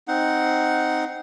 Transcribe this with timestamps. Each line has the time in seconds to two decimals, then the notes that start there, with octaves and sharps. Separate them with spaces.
0.08 C4 D#4 F#5